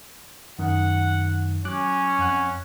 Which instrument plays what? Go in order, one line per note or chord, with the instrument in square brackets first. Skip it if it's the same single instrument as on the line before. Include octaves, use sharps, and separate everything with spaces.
[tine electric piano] F#2 D#3 [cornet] F#5
[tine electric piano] F#3 D6 F#6 [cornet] C#4
[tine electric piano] F2 F#5 F#6